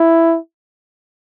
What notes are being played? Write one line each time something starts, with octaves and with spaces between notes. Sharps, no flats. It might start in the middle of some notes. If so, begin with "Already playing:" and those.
Already playing: E4